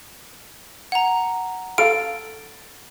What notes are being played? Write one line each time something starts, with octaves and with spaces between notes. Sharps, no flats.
F#5 A#5
A4 F5 D7